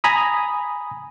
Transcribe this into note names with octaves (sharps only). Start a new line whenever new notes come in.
G#5 A#5 B5 D#6